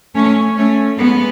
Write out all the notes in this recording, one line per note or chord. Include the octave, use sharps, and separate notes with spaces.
A3 C#4
A3 C#4
G#3 B3